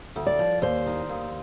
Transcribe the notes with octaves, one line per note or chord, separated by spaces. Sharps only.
D2
D5
F3
D#2 C5
D#3
D#2